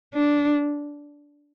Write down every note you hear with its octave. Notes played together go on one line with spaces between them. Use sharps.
D4